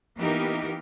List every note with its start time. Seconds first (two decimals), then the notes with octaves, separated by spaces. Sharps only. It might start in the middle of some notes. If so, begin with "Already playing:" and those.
0.17 E3 A#3 B3 D#4 G4 A#4